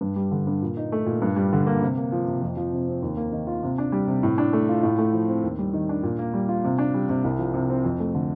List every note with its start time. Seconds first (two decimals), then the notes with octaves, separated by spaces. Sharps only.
0.01 G2
0.16 G3
0.31 D3
0.47 G2
0.62 A#2
0.77 D#4
0.92 A3
1.06 A#2
1.22 G2
1.36 G3
1.53 D3
1.67 A#3
1.82 C3
1.97 A#3
2.12 F3
2.27 C3
2.42 F2
2.57 F3
2.73 C3
2.88 C4
3.02 D#2
3.17 A#3
3.32 D#3
3.47 F4
3.63 C3
3.78 D4
3.92 G3
4.07 C3
4.23 A2
4.38 D4
4.53 A3
4.69 F4
4.83 A2
4.98 A3
5.13 F3
5.28 C4
5.43 D#2
5.59 G3
5.74 D#3
5.89 D4
6.03 A#2
6.19 A#3
6.34 G3
6.49 F4
6.64 C3
6.78 D4
6.94 G3
7.09 C3
7.24 C2
7.39 F3
7.54 C3
7.70 C4
7.84 F2
8.00 A3
8.15 D3